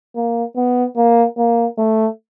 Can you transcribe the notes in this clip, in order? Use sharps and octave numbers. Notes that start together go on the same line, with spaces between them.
A#3
B3
A#3
A#3
A3